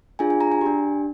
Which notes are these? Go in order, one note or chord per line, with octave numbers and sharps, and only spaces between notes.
D4 F4 G#4 G#5
G#5
A#5
G#5
D4 G4